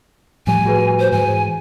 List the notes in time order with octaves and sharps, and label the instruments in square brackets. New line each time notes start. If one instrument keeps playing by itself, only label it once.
[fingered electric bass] A2 F3 G3 [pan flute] G#5
[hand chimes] F#4 G#4 B4
[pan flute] C5
[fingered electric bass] G#2 E3 [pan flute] G#5